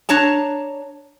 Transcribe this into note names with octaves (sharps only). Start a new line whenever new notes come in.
D4 C#5 A5 A#5